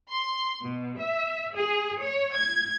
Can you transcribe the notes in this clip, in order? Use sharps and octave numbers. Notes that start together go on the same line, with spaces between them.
C6
B2
E5
G#4
C#5
G#6